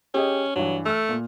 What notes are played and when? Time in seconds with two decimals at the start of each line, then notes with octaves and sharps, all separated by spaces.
0.14 C#4 G4 G#4 D#5
0.56 G2 E3 F#3
0.86 A3 E6 F6
1.09 A#2